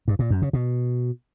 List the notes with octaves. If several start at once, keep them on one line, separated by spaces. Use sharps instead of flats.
G2
A#2
F#2
C#3
B2